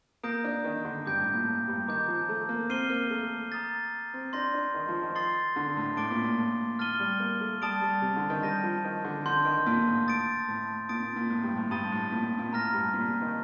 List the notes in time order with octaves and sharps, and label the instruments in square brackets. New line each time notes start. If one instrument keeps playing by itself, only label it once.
[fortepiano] A#3 [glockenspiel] A#5 D#6 G6 A#6 D7
[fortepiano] D4
D#3
D3
[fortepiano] G2 [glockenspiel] D6 G6 D7
[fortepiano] A2
A#2
A2
G2
[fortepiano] D#3 [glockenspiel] A#5 D6 G6
[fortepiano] F3
A3
A#3
[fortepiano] C4 [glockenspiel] F6 C7 D#7 G7
[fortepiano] A#3
A3
[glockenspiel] A#5 D#6 A6
[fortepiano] C4
[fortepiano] D4 [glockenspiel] C6 G6 A#6
[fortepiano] D4
D#3
F3
D#3
[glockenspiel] C6 D#6 A6 C7 G7
[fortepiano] D3
A2
[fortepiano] A2 [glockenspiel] D6 A6 D7 G7
[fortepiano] A#2
A#2
A2
[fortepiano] A2 [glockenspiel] F6 A6 D#7 G7
[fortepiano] G3
A#3
A3
[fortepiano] G3 [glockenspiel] A5 D#6 A6 D7 F7
[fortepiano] G3
C3
D3
D#3
[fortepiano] G3 [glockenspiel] G6 A#6 D#7
[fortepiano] F3
D#3
D3
[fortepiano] D3 [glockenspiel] A5 C6 G6
[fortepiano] D#3
A#2
A2
[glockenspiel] D#6 A6 D7
[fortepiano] A2
[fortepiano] A#2 [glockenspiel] D#6 A6 D7
[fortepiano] A#2
A#2
A2
G2
A2
[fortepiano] G2 [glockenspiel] A5 D#6 A6 D#7 G7
[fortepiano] A2
A#2
A#2
[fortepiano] A2 [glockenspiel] A#5 F6 A#6
[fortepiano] G2
A#2
C3
D#3